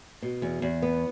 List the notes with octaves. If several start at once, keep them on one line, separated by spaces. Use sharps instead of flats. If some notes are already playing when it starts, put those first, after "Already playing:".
B2
E2
E2
B3